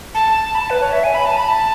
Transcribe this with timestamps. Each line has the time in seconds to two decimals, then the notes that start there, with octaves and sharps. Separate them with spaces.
0.14 A5
0.55 B5
0.59 A5
0.70 B4
0.81 C#5
0.92 E5
1.04 G#5
1.14 B5
1.26 A5
1.37 B5
1.48 A5